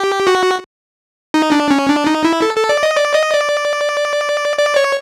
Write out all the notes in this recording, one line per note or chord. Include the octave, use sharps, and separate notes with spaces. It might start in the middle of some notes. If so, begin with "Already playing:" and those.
Already playing: G4
F#4
D#4
D4
C#4
D4
D#4
E4
A4
A4
D5
D#5
D5
D#5
D5
D5
C#5